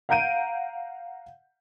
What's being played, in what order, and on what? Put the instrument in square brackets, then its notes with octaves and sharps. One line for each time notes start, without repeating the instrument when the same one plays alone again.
[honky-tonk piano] F5 F#5 A#5 G6 D7 D#7